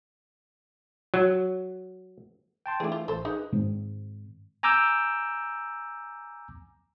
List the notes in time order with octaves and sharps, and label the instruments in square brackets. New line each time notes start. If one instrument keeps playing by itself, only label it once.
[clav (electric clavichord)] F#3
[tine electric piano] G5 A5 C6
[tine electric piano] E3 A3 [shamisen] D4 G#4
[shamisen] F4
[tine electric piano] A1 [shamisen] A4 C5
[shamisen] D#4 [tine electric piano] G#4 B4
[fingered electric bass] G#2 D#3 G#3 C4
[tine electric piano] G#5 A#5 D6 E6 G6